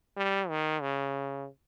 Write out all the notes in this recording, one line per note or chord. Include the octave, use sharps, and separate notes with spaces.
G3
D#3
C#3